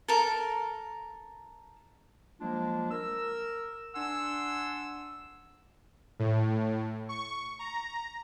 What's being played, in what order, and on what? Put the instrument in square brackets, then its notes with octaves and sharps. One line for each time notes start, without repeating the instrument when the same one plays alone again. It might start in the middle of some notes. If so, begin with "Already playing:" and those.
[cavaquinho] A4 A#4
[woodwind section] F3 F#3 G#3 A#3 D4 F4
A#4 E6
D4 F#5 G#5 C6 E6
[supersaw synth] A2
C#6
A#5